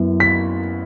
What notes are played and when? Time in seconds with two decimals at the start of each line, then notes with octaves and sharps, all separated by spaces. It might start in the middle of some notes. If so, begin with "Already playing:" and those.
Already playing: F#2 B3 E4
0.20 B6